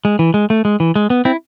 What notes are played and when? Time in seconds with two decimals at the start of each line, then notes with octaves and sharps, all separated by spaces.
0.05 G#3
0.19 E3
0.34 G#3
0.50 A3
0.65 G#3
0.80 E3
0.96 G#3
1.10 B3
1.25 C4 E4